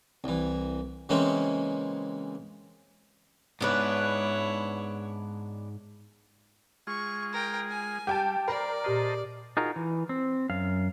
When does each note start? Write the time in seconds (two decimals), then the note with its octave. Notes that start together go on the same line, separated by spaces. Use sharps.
0.24 C2 E3
1.09 C#3 E3 G#3 A#3 C4 C#4
3.61 G#2 B3 D4 E4 B4 C#5
6.87 G#3 F4 G#4 C#6
7.32 A#4 G5
7.70 G#5
8.07 G3 G4 G5 A5
8.48 A#4 C5 D5 B5
8.84 A#2 G4 C5 D#5 A5 F6
9.57 D#4 F4 F#4 G#4 A#4
9.76 E3
10.09 C4
10.50 F#2 F5